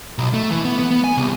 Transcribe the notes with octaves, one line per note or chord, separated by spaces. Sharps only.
B1
A3
E3
B3
B3
B3
G#5
C2